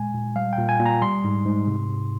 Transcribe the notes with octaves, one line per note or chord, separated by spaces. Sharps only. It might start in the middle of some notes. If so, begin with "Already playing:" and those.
Already playing: A#2 G#3 G#5
A#2
G3 F5
G5
A#2
G#5
A#2
A#5
G3 C6
G#2
G#2
C3
C3